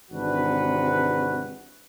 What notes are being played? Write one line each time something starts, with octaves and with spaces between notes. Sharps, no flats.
G#1 C3 E3 D4 F#4 B4